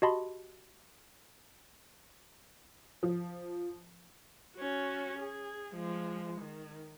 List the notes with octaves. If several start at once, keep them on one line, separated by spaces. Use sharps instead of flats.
F#4 G4 D#5 A5 B5 C6
F3
C#4 F#4
G#4
F3 G#3
D#3